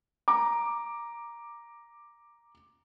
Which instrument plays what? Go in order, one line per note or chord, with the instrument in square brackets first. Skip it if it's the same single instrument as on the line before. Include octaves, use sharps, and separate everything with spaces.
[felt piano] A#5 D6